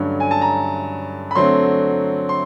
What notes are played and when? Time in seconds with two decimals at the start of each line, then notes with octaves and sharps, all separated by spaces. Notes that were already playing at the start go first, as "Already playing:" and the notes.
Already playing: G2 D3 F#3 A3 C#4
0.20 G#5
0.31 A5
0.41 A#5
1.31 B5
1.35 D3 F#3 A3 C4 C6
2.29 C6